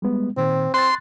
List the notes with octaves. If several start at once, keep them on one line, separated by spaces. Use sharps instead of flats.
G3 G#3 B3
A#2 D#3 C4
C4 C6 F#6 A6